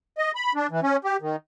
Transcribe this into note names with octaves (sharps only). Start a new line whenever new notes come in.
D#5
B5
D4
E3
C#4
G4
D#3